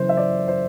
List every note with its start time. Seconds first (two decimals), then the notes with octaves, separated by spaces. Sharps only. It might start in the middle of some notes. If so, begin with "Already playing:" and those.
Already playing: F#1 F#2 E3 C5
0.09 E5
0.17 D5
0.48 C5